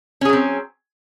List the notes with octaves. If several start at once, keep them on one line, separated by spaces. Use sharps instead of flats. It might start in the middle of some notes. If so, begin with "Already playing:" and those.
F#3 C4 C#4 G#4